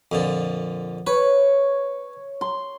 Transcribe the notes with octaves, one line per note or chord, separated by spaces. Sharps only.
F2 A#2 D3
B4 C#5
C6